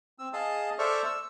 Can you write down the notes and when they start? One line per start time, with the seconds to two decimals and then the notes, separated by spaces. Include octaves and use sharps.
0.19 C4 E6
0.33 G#4 D#5 F5 A5 D#6
0.79 A4 C5 D5 E5 C#6 F6
1.04 E6